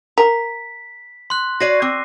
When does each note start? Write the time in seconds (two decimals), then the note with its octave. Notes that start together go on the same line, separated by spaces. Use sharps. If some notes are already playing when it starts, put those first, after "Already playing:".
0.18 A#4 B6
1.30 C6 F#6
1.60 F#4 C#5 D5 A#6 C7 D#7
1.82 C4 D6